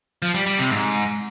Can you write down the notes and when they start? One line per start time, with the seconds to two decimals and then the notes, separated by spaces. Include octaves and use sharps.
0.22 F3
0.34 G3
0.46 G3
0.58 C3
0.70 G#2